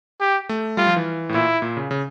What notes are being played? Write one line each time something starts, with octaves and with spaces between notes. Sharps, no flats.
G4
A3
G3 F4
F3
E3
A2
A#2 E4
A#2
C#3
C#3